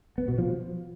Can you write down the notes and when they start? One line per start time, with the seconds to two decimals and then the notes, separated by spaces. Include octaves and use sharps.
0.18 B3
0.28 B2
0.38 F3